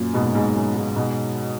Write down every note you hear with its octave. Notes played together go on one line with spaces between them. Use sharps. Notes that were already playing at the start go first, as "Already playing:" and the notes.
Already playing: F#2 A#2
G#2 B2
G#2 B2
F#2
G#2
G#2 B2